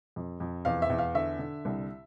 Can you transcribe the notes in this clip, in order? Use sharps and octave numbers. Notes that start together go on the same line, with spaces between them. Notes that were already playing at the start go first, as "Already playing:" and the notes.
F2
F2
E2 F5
E5
E2
F5
D3 E5
D3
C2